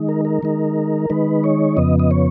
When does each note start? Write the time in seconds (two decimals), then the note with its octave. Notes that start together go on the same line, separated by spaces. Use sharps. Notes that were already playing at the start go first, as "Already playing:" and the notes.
Already playing: D#3 G#3 D#4
0.09 A#4
0.25 A#4
0.43 D#3 G#3 D#4
1.10 D#3 G#3 D#4 B4
1.44 C#5
1.77 F2 C#3 F3 B3 D#5
1.99 D#5
2.11 C#5